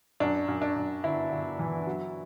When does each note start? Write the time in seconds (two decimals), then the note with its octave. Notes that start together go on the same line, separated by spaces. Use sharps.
0.20 F#2 D4
0.48 F#2
0.62 D4
0.76 F#2
1.03 G1 E4
1.31 G1
1.59 E3
1.87 F#3